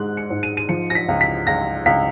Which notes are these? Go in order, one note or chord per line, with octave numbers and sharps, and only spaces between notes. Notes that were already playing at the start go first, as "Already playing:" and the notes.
Already playing: G#2 G#3 F#6
C#7
G#2
D#7
D#7
F3 C#7
A#6
B6
C#2
B6
C#2 A#6
C#2 B6